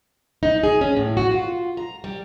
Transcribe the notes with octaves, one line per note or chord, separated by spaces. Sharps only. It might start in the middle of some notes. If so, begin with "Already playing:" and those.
D#4
G#4
C#4
A2
F#4
F4
A#5
G3